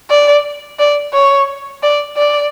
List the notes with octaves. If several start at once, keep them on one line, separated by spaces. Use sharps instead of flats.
D5
D5
C#5
D5
D5